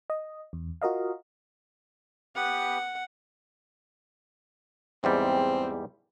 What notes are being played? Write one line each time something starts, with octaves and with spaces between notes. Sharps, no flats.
D#5
E2
F4 F#4 A#4 D#5 F5
B3 G4 B4 F#5
E2 G#2 G3 C4